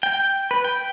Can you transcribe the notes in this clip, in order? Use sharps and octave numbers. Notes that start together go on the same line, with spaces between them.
G5
B4
G5